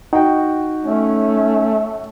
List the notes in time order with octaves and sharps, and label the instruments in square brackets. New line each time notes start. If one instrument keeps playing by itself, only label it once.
[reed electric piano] D#4 [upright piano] F#4 G5
[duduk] A3 [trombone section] C#4